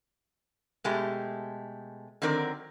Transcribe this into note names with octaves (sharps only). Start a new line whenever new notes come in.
B2 G#3 A3 G4
D3 D#3 F#3 C4 A#4 D5